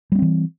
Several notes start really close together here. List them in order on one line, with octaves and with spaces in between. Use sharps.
G3 B3 C4 E3